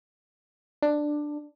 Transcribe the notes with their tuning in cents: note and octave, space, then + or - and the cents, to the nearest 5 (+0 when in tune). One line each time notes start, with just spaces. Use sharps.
D4 +10